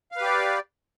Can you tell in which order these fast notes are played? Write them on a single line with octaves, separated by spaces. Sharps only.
F5 B4 G4 D5